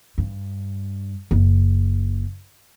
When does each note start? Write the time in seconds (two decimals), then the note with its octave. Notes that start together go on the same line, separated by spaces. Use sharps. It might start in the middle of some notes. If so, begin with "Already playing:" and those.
0.18 G2
1.31 F#1